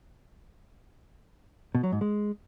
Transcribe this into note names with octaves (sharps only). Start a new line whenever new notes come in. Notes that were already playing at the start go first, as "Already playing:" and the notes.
B2
F#3
G#2
G#3